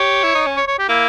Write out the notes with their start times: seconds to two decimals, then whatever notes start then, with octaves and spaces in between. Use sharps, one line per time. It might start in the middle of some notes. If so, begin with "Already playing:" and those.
Already playing: G4 C#5
0.23 E4
0.35 D#4
0.46 C#4
0.57 C#5
0.67 C#5
0.79 G4
0.89 A#3 E4